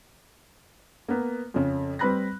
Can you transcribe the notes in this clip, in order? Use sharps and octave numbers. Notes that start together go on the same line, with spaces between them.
A#3 B3
F2 C#3
G3 C4 B4 B5 F#6 A#6